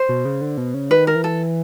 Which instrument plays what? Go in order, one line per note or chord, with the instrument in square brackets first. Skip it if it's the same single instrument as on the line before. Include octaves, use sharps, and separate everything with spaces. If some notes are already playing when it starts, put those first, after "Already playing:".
Already playing: [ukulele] C5
[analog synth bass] B2
C#3
D3
B2
C#3
[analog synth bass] D#3 [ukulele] B4
[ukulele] A#4
[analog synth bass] E3
[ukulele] A4